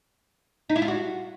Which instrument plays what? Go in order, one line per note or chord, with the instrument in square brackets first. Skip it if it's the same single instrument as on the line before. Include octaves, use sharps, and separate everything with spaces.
[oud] D#4
E4
F4
F#4